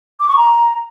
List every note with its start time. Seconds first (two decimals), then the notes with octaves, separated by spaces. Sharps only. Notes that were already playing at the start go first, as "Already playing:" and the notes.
0.20 D6
0.28 C#6
0.36 A#5